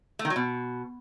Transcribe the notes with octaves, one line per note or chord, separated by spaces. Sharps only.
A3
D#3
F#3
B2